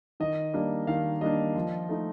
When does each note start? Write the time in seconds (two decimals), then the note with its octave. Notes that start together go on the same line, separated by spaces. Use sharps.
0.20 D#3 D#5
0.54 G3 A#3 D4
0.87 D#3 F5
1.21 G3 A#3 D4 D#5
1.55 F3
1.89 A3 D#4